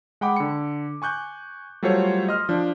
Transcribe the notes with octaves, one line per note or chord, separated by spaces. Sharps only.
G#3 F#5 G5 B5 D6
D3 C#7
G#5 C#6 F#6 G6
F#3 G3 A3 F4 C5 C#5
D#5 C6 F6
F3 D4